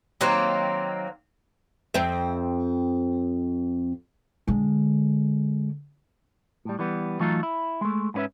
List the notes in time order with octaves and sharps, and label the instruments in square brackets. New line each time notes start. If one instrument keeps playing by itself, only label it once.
[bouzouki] D#3 F#3 A#3 C4
[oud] F2 C4 E5
[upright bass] D3 G#3
[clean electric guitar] A2 G3
E3 G3 B3
E3 F#3 A3 D#4 F4 A4
E4
G#3 A3
G#2 B3 C#4 B4 E5